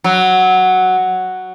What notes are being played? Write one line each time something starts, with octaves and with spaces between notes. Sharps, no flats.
F#3